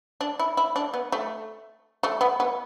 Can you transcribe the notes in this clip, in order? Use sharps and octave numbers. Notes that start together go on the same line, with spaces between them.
D4
E4
E4
D4
B3
A3
A3
B3
B3